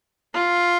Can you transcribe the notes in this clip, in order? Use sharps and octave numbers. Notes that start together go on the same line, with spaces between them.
F4